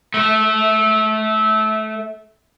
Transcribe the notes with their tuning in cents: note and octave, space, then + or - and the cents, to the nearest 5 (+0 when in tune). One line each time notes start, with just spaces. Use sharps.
A3 -20